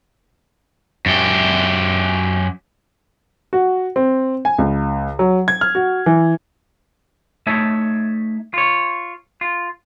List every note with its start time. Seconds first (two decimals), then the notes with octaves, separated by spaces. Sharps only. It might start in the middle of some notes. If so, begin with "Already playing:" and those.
1.06 F#2 G4
3.53 F#4
3.96 C4
4.45 G#5
4.58 C#2
5.19 F#3
5.48 G#6
5.61 F6
5.75 F#4
6.06 E3
7.47 A3 D#4 C#5 E5 A5
8.54 F4 C#5
9.41 F4